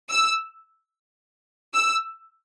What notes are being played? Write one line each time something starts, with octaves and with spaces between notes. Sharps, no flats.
E6
E6